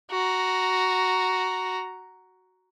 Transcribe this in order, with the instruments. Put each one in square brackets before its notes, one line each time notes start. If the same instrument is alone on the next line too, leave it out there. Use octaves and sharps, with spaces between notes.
[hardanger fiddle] F#4 A#5